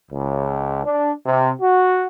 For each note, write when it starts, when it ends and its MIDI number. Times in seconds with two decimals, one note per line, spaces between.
0.11 0.84 37
0.85 1.12 62
1.26 1.52 48
1.61 2.05 66